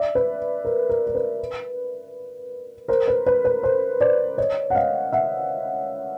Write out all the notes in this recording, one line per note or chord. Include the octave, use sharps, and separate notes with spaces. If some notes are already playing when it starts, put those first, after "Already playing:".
Already playing: D5 E5
B4
A#4
A#4
A#4
B4
A#4 C5
B4
B4
B4
A#4 C5
C5 D5
C#5 D#5
F#5
D#5 F5
E5 F#5